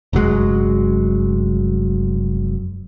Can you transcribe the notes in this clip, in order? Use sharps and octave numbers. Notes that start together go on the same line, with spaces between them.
F1 F#2 F#3 G#3